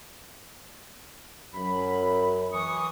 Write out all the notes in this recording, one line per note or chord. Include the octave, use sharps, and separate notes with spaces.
F#2 B5
E3 C#6 D#6